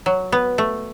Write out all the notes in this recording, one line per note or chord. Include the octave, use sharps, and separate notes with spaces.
F#3
B3
A3